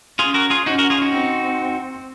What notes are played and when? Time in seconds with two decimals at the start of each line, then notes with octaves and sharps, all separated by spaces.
0.19 C#4 F4 G#4
0.34 F#4 A#4
0.50 F4 G#4
0.66 C#4 D#4 F#4
0.78 F#4 A#4
0.90 F4 G#4
1.01 D#4 F#4
1.14 C4